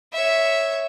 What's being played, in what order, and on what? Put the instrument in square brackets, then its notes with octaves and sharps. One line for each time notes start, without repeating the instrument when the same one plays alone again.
[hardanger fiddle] C#5 E5